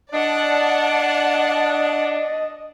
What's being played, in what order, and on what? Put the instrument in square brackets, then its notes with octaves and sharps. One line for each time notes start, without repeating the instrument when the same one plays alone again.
[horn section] D4 [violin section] D5 F#5 A5 [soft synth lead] D#5